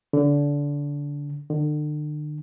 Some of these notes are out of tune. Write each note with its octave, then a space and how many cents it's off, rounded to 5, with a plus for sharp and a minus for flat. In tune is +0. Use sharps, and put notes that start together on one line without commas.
D3 -20
D3 +40